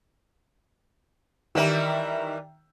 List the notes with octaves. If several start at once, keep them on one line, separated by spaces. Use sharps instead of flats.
D#3 E3 G3 A#4 E5